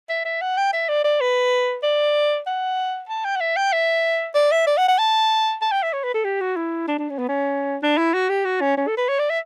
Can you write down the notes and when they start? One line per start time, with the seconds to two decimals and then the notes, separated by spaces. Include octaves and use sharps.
0.09 E5
0.25 E5
0.41 F#5
0.57 G5
0.73 E5
0.89 D5
1.04 D5
1.21 B4
1.83 D5
2.47 F#5
3.09 A5
3.25 G5
3.36 F#5
3.40 E5
3.56 G5
3.73 E5
4.35 D5
4.51 E5
4.67 D5
4.77 F#5
4.88 F#5
4.99 A5
5.62 A5
5.72 G5
5.83 E5
5.93 C#5
6.04 B4
6.14 A4
6.25 G4
6.41 F#4
6.56 E4
6.88 D4
6.98 D4
7.09 C#4
7.19 B3
7.29 C#4
7.83 D4
7.98 E4
8.14 F#4
8.29 G4
8.45 F#4
8.61 C#4
8.77 C#4
8.87 A4
8.98 B4
9.09 C#5
9.19 D5
9.30 E5